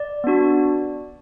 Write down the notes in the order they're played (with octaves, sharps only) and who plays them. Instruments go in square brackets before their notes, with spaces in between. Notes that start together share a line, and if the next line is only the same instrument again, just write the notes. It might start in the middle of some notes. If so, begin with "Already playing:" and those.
Already playing: [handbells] D5
B3 D4 F#4